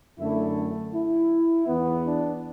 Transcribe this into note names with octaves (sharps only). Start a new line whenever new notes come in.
F#2 D3 A3 E4
E4
E2 E3 B3
D4